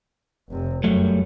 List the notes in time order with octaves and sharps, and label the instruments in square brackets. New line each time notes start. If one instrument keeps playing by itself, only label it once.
[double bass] F1 C3
[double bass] F#2 [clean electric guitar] F#3 G3 A3